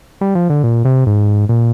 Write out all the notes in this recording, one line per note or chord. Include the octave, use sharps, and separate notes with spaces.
G3
F3
D3
A#2
C3
G#2
A#2